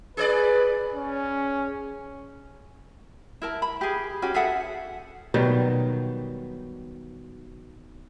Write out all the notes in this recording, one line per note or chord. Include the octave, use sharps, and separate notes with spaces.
G#4 B4 C5 D5
C#4
E4 A#4 A5
B5
G4 G#4
C#4 F#4 G4
G#4 A4 E5 F#5
B2 D#3 F#3 G3